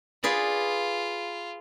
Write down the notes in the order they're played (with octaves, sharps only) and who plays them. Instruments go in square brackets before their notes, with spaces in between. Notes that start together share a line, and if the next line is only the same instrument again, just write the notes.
[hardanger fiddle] F4 [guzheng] G#4 B4 D5